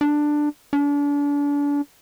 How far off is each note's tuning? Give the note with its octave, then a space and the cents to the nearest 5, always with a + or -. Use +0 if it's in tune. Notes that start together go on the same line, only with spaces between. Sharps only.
D4 +10
D4 -35